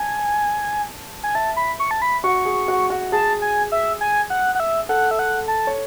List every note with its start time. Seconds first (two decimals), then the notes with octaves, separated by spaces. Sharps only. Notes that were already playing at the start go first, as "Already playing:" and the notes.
Already playing: G#5 A5
1.23 G#5
1.35 E5 A5
1.57 B5
1.80 C#6
1.91 A5
2.02 B5
2.24 F#4 C#6
2.45 G#4
2.68 F#4
2.90 F#4
3.12 G#4 A5
3.42 G#5
3.72 E5
4.01 G#5
4.30 F#5
4.55 F#5
4.60 E5
4.89 A4 F#5
5.11 E5
5.19 F#5
5.48 A5
5.67 C#5